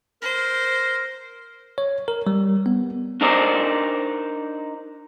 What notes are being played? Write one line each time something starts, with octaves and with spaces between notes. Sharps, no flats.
A#4 C5
C#5
A#4
G3
B3
D4 D#4 A#4 C5 D5